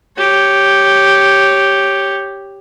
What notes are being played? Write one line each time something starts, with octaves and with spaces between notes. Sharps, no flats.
G4 C#5